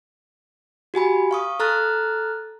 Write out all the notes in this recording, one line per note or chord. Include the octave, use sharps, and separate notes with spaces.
F#4 G4 G#5 B5
F5 C#6 D#6
A4 A#5 F6 F#6 A6